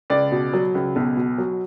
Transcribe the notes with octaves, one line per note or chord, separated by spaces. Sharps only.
C#2 D5
B2
F#3
C#2
B1
B2
F#3